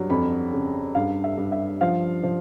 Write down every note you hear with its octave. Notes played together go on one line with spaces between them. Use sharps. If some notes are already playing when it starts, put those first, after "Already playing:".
Already playing: G2 F#3
F2 B5
C#3
G2 F5
E5
G2
E5
F3 F5
F3